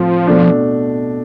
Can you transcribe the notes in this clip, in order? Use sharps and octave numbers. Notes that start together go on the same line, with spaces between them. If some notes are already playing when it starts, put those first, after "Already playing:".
Already playing: A2 F3 C4
B2 A3 D4